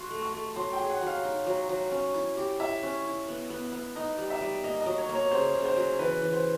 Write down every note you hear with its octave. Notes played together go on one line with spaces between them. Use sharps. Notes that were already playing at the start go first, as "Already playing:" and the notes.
Already playing: F#4 C6
A3
C#6
A3
F#3 C6
G5
G#4
F#5
F#3 F5
D#4
F#3
F#3
C#4
E4
G4
E4 E5
C#4
E4
B3
B3
B3
D#4 D#5
G3
E5
G3
A#3 D#5
D#5
F#3
C#5
A#3
C#5
C#3 C5
C#3
C5
F#3
E3 B4
E3
C5